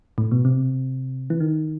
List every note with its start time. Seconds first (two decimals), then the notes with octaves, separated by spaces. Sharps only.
0.18 A2
0.32 B2
0.45 C3
1.30 E3
1.40 D#3